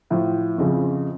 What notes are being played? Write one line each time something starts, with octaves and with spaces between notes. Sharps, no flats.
A2 F3
F2 C#3 F3